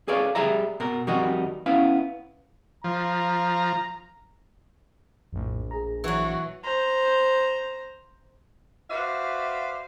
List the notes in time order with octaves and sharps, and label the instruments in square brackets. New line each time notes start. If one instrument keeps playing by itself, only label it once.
[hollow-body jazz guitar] G#4 A4 B4 C#5 D5 F5
G3 G#4 E5 A#5
B2 A#4
F2 D#3 G3 D#4 F#4
B3 C#4 E4 F5
[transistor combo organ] F3 [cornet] A#5
[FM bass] A#1 [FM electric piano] F2 A2
[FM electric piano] G#4 A#5
[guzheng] E3 F#3 [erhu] F#4
[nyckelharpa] C5 A#5
[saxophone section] F#4 B4 C5 D5 E5 F5